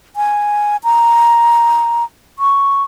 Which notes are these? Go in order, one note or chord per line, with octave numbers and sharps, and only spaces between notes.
G#5
A#5
C#6